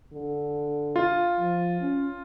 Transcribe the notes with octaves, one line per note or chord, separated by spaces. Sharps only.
D3
F4
F3
C#4